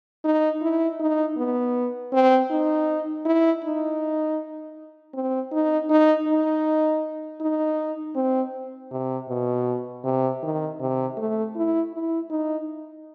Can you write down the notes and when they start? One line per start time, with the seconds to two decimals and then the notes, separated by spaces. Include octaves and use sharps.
0.25 D#4
0.62 E4
1.00 D#4
1.37 B3
2.13 C4
2.51 D#4
3.26 E4
3.64 D#4
5.14 C4
5.52 D#4
5.90 D#4
6.28 D#4
7.41 D#4
8.16 C4
8.91 C3
9.29 B2
10.04 C3
10.43 D#3
10.81 C3
11.17 A3
11.56 E4
11.93 E4
12.30 D#4